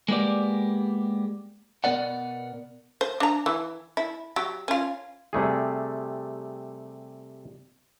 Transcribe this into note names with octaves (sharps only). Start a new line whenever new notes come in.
G#3 A#3 B3 G4 D5
B2 B3 A#4 D5 F#5
C5
D4 A#5
E3
E4
F#3 G4
C#4 F4
C3 G3 A3 G#4